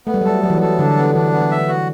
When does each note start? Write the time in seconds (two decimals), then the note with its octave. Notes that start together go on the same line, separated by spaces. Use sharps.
0.07 A3 B3
0.14 G3
0.21 F#3
0.25 G3 A4
0.44 F#3 B3
0.50 E3
0.58 F#3 A4
0.79 D3 D4
0.97 B3
1.15 E3 D4
1.32 B3
1.51 E5
1.68 F#4